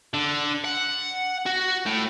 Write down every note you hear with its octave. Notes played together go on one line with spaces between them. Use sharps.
D3
F#5
F#4
A2